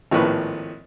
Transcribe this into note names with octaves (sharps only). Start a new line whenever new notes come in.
G#1 A2 F3 A#3 B4 C#6